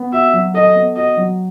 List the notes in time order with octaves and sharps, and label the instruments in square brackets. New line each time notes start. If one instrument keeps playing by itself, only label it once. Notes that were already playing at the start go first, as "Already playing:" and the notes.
Already playing: [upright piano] B3
[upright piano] F#4 [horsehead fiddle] E5
[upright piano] F#3
[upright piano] A4 [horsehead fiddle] D#5
[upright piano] B3
[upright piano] F#4 [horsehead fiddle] D#5
[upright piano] F#3